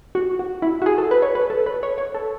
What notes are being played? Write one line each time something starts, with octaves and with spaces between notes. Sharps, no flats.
F#4
F#4
E4
F#4
G#4
A4
B4
C#5
B4
A4
B4
C#5
C#5
A4